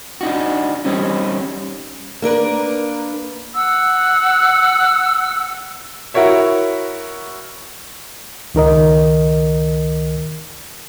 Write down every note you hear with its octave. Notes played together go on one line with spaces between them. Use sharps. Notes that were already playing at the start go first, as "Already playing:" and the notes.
D4 D#4 F#4
G3 C4 C#4 D#4
A#3 D4 A#4 B4
F#5 E6
E4 F#4 A#4 C#5 E5
C#2 D#3 A#4 D#5